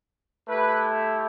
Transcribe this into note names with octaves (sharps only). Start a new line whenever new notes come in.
A3 E4 G4 B4